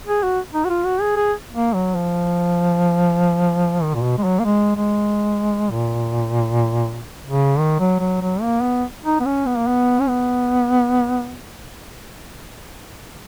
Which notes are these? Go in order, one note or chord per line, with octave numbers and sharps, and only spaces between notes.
G#4
F#4
D#4
F#4
F4
F#4
G#4
G#4
A#3
F#3
F3
D#3
A#2
B2
G#3
F#3
A#3
G#3
G#3
A#2
C#3
D#3
F#3
F#3
F#3
A#3
B3
D#4
B3
C#4
B3
A#3
B3
C#4
B3